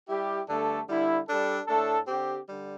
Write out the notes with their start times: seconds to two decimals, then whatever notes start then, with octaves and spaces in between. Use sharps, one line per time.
0.08 G3 E4 G4
0.48 G2 D3 A3 D4 A4
0.88 D3 G3 E4
1.27 G3 D4 A4
1.67 A2 A3 D4 A4
2.07 D3 C4 G4
2.47 D3 G3